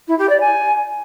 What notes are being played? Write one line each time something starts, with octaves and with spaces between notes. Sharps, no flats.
E4
G4
D5
G#5